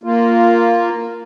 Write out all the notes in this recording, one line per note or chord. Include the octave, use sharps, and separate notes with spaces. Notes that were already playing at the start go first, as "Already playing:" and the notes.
A#3 F4